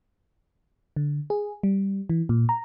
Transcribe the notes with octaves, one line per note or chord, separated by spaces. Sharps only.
D3
G#4
G3
E3
A#2
A#5